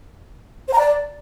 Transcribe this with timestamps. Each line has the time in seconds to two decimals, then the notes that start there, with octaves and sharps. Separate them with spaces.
0.68 C5
0.73 A#5
0.78 D5